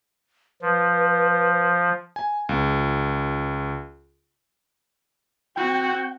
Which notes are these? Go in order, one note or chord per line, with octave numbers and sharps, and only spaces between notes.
F3 B4
G#5
C#2
C4 F#4 G5